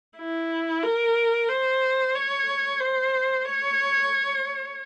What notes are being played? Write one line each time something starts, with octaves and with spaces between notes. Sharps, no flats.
E4
A#4
C5
C#5
C5
C#5